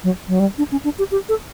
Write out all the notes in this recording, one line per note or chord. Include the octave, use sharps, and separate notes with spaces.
F#3
F#3
G3
D4
C#4
D4
G4
G4
A4